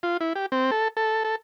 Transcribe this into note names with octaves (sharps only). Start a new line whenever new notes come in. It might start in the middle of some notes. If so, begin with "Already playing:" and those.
F4
E4
G4
C4
A4
A4
A4